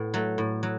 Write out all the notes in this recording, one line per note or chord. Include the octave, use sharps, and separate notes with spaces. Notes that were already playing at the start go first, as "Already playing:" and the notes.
Already playing: A2 B3
F#3 A3
A2
F#3